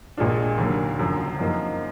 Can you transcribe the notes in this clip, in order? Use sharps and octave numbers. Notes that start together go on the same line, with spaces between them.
A#1 A#2 G#3 D4 F4
D#2 D3 F#3 A#3
F#1 F#2 D3 F3
F#2 F3 A#3 D#4